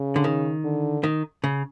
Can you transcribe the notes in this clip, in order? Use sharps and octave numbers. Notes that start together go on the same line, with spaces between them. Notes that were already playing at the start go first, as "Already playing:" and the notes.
Already playing: C#3
D3
D#3
D3
D#3
C#3